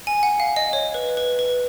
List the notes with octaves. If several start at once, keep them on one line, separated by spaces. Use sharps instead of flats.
G#5
F#5
F5
D#5
C#5
B4
B4
B4